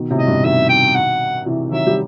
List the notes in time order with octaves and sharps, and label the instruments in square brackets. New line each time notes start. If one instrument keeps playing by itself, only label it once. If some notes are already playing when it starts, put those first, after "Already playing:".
Already playing: [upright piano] B2 D#3
A2 C3
[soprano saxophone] D#5
[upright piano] G2 B2
[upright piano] B2 D#3 [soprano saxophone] E5
[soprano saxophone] G5
F#5
[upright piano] C3 E3
[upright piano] D#3 F#3 [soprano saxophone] E5
[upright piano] G3